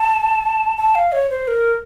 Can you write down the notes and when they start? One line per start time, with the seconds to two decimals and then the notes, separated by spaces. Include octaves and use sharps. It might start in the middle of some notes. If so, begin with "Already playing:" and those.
Already playing: A5
0.77 A5
0.95 F5
1.12 C#5
1.30 C5
1.48 A#4